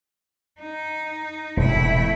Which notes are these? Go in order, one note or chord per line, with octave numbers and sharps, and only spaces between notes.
D#4
E1 A2 C3 A3 E4